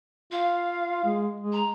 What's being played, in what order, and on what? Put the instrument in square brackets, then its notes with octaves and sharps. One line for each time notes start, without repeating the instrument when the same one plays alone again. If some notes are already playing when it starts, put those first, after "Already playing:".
[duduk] F4 [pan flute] F5
[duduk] G#3
G#3
[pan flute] A#5